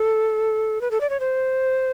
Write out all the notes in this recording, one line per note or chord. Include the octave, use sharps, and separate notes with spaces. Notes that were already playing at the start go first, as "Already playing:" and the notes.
Already playing: A4
B4
A4
D5
C#5
C5